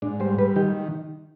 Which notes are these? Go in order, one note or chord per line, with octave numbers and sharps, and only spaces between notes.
G#2 D4
G3 C5
G3 B4
D#3 G4